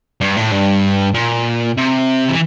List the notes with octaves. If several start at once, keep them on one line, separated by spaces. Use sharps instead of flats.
G2
A2
G2
A#2
C3
E3